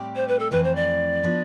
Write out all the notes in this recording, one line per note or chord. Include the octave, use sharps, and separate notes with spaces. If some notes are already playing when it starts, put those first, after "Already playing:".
Already playing: A2 G3 C4 G4 D5
C5
B4
A4
F2 E3 A3 C4 B4
C5
D5
F3 B3 D4